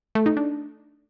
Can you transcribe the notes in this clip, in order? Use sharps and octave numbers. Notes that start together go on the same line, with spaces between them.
A3
D#4
D4